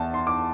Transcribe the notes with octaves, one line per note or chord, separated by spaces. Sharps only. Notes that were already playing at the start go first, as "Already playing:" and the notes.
Already playing: E2 A5
C6
D6